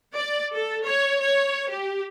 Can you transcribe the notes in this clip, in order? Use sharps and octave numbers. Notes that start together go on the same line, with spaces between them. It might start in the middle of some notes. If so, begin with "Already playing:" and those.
D5
A4
C#5
C#5
G4